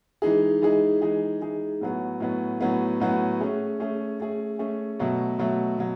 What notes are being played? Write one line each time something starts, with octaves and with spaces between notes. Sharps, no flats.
E3 G#3 D#4 G#4
E3 G#3 D#4 G#4
E3 G#3 D#4 G#4
E3 G#3 D#4 G#4
A2 F#3 B3
A2 F#3 B3
A2 F#3 B3
A2 F#3 B3
A3 C#4 G#4
A3 C#4 G#4
A3 C#4 G#4
A3 C#4 G#4
B2 F#3 A3
B2 F#3 A3
B2 F#3